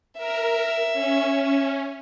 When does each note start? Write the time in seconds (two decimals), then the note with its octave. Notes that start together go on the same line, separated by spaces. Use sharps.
0.17 A#4 E5
0.93 C#4